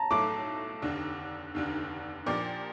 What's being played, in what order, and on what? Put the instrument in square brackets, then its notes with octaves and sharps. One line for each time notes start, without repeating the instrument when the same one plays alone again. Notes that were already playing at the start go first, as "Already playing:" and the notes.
Already playing: [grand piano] A5 A#5
[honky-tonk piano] B1 A2 F#3 A3 [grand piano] D6
[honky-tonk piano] F1 D#2 D3
F1 D#2 D3
[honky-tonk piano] A#2 F3 A#3 D4 G4 [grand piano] D6